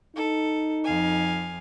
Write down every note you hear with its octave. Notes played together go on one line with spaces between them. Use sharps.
D#4 A4
F2 F5 G#5